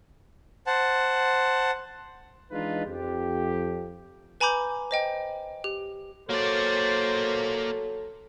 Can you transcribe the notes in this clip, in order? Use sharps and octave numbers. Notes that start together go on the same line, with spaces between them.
C5 F#5 A5
E3 G#3 D4 D#4 F4 B4
F2 G4
B4 G#5 A#5 B5 D6 G6
C5 D#5 G5
G4
F#3 A#3 A4 C5 D5